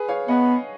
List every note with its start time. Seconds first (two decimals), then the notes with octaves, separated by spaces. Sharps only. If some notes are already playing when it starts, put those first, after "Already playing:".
Already playing: G#4 B4
0.08 C#5 F5
0.28 B3 D#5 F#5